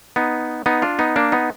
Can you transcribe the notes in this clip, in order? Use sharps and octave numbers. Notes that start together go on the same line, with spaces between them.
B3 D#4
B3 D#4
D4 F4
B3 D#4
A#3 D4
B3 D#4